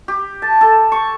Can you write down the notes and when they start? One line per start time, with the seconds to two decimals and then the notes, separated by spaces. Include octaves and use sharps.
0.08 G4
0.42 A5
0.61 A4
0.92 C#6